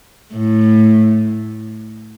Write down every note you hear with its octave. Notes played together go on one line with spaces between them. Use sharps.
A2